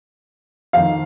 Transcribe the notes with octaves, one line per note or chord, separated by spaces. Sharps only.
F2 D#3 F5